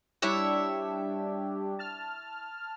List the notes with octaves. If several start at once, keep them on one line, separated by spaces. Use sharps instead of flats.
G3 D4 E4 G4 C#5 E5
A5 F6